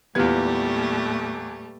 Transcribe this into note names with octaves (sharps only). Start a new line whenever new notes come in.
E2 A#2 G3 A3 B3 F4 G4 G#6